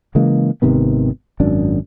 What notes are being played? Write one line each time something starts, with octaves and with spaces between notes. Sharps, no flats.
C#3 E3 G#3 A#3
G#1 C3 D#3 B3
G#1 F#2 D4